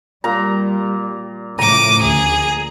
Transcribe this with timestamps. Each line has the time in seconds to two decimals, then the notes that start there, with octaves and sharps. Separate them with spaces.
0.24 A#2 G3 A#5
1.59 A2 C#3 F3 A#5 D6 D#7
2.02 D2 G#4